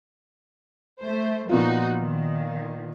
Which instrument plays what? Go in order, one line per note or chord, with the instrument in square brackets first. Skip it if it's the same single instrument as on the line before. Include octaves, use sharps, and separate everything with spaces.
[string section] A3 C5
[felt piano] A#2 B3 F4 [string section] F3 D#4 F#4
[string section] D#3